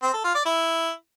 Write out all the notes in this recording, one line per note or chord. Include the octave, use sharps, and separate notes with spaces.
C4
A4
F4
D5
E4